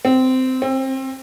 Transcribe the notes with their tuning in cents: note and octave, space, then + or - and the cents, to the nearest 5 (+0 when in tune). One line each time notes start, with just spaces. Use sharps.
C4 -15
C4 +25